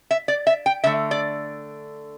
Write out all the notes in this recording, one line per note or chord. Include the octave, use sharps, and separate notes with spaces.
E5
D5
E5
G5
D3 A3 E5
D5